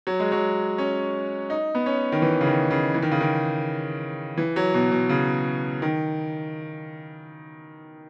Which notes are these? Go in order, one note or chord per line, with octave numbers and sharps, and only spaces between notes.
F#3
G#3
F#3
C#4
D#4
B3
C#4
D#3
E3
C#3
D#3
C#3
E3
D#3
C#3
D#3
E3
F#3
B2
B2
C#3
D#3